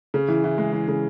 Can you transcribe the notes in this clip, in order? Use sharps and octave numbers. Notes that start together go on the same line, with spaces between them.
C#3
E3
E3
G#3
E3
C#3